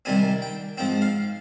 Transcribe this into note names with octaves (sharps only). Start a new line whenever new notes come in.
C2 C3 D#3 G3 C4 G#5
G5
G#2 F3 C4 G5
F5